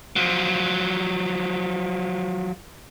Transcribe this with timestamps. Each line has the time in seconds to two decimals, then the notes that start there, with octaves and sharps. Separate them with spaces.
0.16 F3 F#3